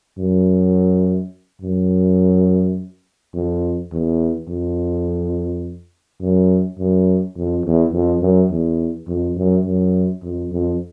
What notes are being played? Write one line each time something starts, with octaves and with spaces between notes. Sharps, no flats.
F#2
F#2
F2
E2
F2
F#2
F#2
F2
E2
F2
F#2
E2
F2
F#2
F#2
F2
F2